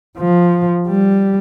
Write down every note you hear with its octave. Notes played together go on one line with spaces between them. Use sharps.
F3
G3